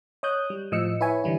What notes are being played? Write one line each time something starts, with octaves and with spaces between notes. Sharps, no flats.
C#5 D#5 D#6 F#6 G6
G3
A2 F3 D#5 E6 C#7
E4 B4 C#5 E5 G#5
D3 E3 G3 E4